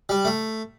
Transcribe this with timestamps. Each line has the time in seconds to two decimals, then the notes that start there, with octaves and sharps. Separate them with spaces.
0.09 G3
0.25 A3